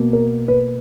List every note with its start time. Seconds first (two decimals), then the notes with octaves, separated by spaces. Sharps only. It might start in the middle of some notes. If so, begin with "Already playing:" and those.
Already playing: B2 A#3
0.13 A#4
0.48 B4